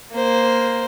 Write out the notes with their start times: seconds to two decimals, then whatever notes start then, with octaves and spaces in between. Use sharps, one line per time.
0.12 A#3 C5